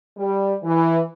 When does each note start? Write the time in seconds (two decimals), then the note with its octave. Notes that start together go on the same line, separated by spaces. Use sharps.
0.18 G3
0.64 E3